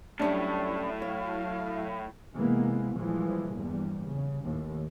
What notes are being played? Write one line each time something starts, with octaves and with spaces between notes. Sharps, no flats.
A2 F#3 G3 A3 C#4 D4 E4
C#5 F5
C3 E3 G#3 A#3 B3
A#2 E3 F3 G3 G#3
A#1 E2 G2 G3
C#3
D#2 A2